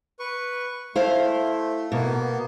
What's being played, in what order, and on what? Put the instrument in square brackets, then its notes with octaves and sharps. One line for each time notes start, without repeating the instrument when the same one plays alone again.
[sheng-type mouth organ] B4 C#6
[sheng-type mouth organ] A3 [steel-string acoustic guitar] E4 C5 F5
[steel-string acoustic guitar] B2 [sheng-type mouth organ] A#3 B3